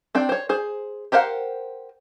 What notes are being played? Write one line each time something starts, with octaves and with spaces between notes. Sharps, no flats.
C4 D4 G5
C5 C#5
G#4 C5
G4 A#4 C5 F5 F#5